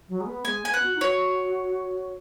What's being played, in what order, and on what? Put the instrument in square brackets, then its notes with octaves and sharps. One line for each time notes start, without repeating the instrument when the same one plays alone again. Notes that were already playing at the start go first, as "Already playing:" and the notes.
[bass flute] F#3
G#3
B3
[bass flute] G#3 [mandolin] G#5
[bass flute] B3 [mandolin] G#5
[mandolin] F#5
[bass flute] F#4
D#4
[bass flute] F#4 [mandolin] C#5